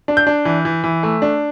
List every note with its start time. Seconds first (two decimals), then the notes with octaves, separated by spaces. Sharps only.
0.08 D4
0.17 G6
0.27 D4
0.45 E3
0.65 E3
0.84 E3
1.03 A3
1.22 D4